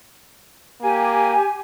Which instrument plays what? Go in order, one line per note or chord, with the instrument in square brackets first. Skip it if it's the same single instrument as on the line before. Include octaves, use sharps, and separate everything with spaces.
[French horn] A#3 [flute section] G4 G#5